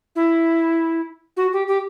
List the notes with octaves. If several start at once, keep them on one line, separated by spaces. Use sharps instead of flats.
E4
F#4
G4
G4